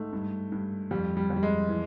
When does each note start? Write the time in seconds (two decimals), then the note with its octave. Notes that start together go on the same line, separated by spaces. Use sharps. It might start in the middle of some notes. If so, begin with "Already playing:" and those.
Already playing: G#2 A3
0.13 G2
0.52 G2
0.91 F2 G3
1.17 G3
1.30 F2
1.36 G3
1.43 G#3
1.69 E3